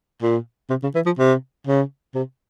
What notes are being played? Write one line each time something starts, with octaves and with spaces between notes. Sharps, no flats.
A#2
C3
C#3
E3
F3
C3
C#3
C3